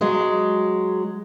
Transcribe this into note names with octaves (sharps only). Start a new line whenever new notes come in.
F#3 G#3